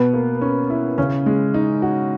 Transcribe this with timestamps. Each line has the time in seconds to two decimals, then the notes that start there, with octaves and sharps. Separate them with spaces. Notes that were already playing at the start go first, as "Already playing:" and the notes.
Already playing: B2 B3
0.14 A#3
0.41 C#4
0.70 E4
0.98 C#3 C#4
1.26 G#3
1.54 D#4
1.82 F#4